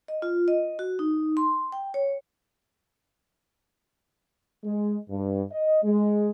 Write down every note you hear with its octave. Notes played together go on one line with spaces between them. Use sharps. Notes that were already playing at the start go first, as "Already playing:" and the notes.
D#5
F4
D#5
F#4
D#4
C6
G5
C#5
G#3
G2
D#5
G#3